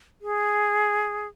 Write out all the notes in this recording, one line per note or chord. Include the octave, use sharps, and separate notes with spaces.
G#4